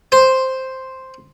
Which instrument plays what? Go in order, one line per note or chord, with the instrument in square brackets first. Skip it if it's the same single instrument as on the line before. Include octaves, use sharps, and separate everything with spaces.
[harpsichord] C5